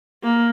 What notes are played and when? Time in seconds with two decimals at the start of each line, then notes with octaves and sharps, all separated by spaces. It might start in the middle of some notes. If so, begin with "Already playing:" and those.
0.23 A#3